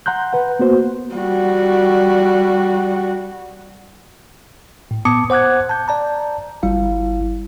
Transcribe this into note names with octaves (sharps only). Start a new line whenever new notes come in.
F#5 A#5 C6 F#6 G6
B4 F#5
A#3 B3 F#4 C5
G3 F#4
A2
A#2 B3 A5 D6 D#6 C#7
C5 F#5 D6 F#6 G#6
A5 G6
D5 A5 A#5
G1 G3 E4 F5